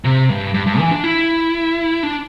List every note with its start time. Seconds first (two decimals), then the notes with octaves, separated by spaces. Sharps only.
0.05 C3
0.29 G2
0.54 G2
0.67 G2
0.79 E3
0.91 D4
1.04 E4
2.03 D4